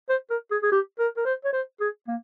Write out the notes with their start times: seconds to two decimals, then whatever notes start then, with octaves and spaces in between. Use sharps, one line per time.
0.09 C5
0.30 A#4
0.51 G#4
0.63 G#4
0.72 G4
0.99 A#4
1.17 A#4
1.25 C5
1.45 C#5
1.53 C5
1.81 G#4
2.08 A#3